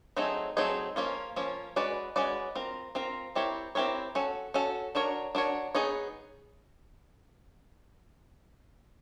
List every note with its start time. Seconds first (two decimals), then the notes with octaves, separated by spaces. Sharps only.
0.16 F#3 A3 C4 D#4 G#4
0.57 F#3 A3 C4 D#4 G#4
0.96 F3 A#3 C#4 F4
1.36 F3 A#3 C#4 F4
1.76 G#3 C#4 F#4 B4 D5
2.16 G#3 C#4 F#4 B4 D5
2.55 C4 F4 A#4
2.95 C4 F4 A#4
3.35 C4 E4 G4 A#4 C#5
3.75 C4 E4 G4 A#4 C#5
4.15 C#4 F#4 A4
4.54 C#4 F#4 A4
4.95 D4 F#4 A#4 C#5
5.35 D4 F#4 A#4 C#5
5.75 B3 D#4 G#4 C#5